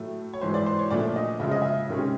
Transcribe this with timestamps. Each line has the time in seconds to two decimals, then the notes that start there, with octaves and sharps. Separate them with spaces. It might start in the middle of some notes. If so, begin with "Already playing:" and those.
Already playing: A2 F#3 A3
0.34 C#5
0.41 G#2 E3 G#3 C5
0.54 D5
0.66 C5
0.79 C#5
0.91 A#2 F3 A3 D4 D5
1.16 D#5
1.40 C#3 F3 G#3 E5
1.51 D#5
1.62 E5
1.90 C3 D#3 G#3 C#4